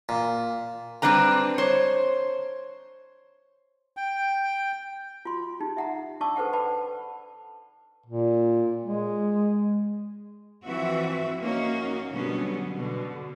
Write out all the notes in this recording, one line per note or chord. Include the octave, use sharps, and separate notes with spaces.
A#2
G3 C4 D4 B4 A#5
C5 C#5
G5
F4 F#4 C6
D#4 G4
E5 F#5 A#5
D4 D5 A5 C#6 D6 E6
A4 B4 C5 F#5 G5
D5 F#5 G5 A5 B5
A#2
G#3
E3 F3 C4 F#4 E5
A#3 C#4 D#4 F#4
B2 D3 F#3 G3 B3 C#4
B2 D3